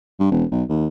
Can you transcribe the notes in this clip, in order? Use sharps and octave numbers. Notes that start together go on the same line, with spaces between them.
G2
E1
B1
D#2